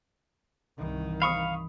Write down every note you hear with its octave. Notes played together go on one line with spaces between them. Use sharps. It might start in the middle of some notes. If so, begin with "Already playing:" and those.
C2 G2 D#3 E3
F5 B5 C#6 D#6